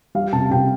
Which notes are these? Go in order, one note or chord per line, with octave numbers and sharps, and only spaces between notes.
G3 F5
C3 A5
C3 G5